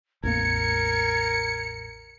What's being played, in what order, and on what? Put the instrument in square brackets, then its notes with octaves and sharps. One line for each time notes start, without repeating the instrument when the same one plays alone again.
[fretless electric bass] A1 E2 A#3 [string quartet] A#4 [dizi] G#6 [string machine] C#7